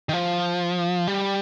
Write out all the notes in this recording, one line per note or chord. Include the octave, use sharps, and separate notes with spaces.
D#3
F3
G3